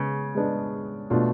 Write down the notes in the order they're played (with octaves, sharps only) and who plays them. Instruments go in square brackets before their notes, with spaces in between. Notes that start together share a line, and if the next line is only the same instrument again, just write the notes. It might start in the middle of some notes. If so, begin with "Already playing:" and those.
Already playing: [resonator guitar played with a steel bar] C#3 [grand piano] G#3 B3
[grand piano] G#3 B3 D4
B2 A3 D4 F4